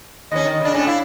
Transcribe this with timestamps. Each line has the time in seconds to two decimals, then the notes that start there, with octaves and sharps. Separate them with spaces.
0.31 D#2 C#4 D#5
0.45 D#3
0.61 C#3 D4
0.74 A2 A3 C#4 D4
0.87 E4 F5